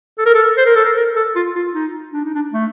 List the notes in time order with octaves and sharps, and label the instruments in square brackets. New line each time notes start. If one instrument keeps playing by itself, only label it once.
[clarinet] A4
A#4
A4
C5
A#4
A4
A#4
A#4
A4
F4
F4
D#4
D4
D#4
D4
A3